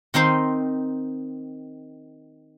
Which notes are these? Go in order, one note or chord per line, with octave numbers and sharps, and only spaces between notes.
D#3 C4 D#4 C5 C6